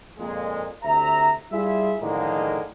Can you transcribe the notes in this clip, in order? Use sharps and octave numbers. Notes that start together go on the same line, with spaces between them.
F2 A#2 G#3
D2 C3 E5 A#5
G3 E4 F4 G#4 E5
A2 D3 D#3 F3 G#3 A#3